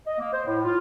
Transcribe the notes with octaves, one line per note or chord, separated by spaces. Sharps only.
D#5
A#3
C5
A2
F4